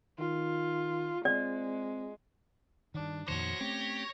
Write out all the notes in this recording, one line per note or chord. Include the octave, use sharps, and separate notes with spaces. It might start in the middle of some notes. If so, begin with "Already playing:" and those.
D#3 F4
G#3 C4 D5
G2 D#3 D4
F2 A#2 D#3 F#4 C5 C#5 A#6
A3 C4 C#4 G4